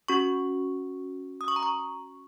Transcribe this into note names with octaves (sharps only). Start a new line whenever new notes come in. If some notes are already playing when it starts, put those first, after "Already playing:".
C#4 F#4 C#6
D#6
C#6
A#5
C#6